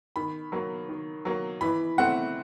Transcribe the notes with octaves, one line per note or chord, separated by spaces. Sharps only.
D#3 B5
F#3 A#3
D#3
F#3 A#3
E3 B5
A3 C4 F#5